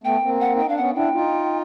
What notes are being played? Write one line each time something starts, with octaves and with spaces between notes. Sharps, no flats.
A3 B3 G5
A#3 C4
F#5
D#4 G5
D4 F5
B3 C#4 F#5
D4 E4 G5
D#4 F4